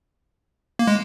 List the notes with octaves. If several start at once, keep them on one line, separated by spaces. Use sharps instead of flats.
A#3
G#3